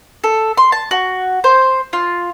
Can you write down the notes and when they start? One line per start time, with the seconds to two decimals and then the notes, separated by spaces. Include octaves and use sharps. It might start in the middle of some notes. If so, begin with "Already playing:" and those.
0.24 A4
0.58 C6
0.72 A5
0.91 F#4
1.44 C5
1.93 F4